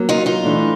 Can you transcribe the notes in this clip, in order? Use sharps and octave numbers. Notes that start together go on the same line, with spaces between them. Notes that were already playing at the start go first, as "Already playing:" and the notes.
Already playing: F#3 A#3 C#4
D#4 F4
D#4 F4
E3 A3 D4